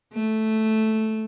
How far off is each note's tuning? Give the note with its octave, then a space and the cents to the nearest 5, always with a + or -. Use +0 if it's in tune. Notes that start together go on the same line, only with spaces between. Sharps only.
A3 -5